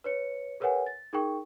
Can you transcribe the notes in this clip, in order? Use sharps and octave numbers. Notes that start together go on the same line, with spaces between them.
B4 C#5 C#7
G#4 A#4 B4 C#5 F#5 G#5
A6
D#4 G#4 A#4 G5 C#6